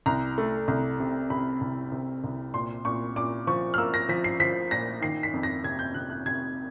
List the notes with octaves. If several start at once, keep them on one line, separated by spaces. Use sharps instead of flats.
C2 A#5
A3
C2
C3
C3 B5
C2
C3
C2
A#2 C6
A#2 C#6
A#2 D6
F3 C#6
F6
A#3 E6
A#6
F3 B6
C7
F3 B6
A#2 A#6
D#3 C7
B6
F2
A#6
C3 G#6
G6
C3 F#6
F#6
C3 G#6